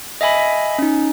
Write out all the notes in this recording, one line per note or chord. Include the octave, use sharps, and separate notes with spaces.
D#5 E5 G#5 B5
C#4 D#4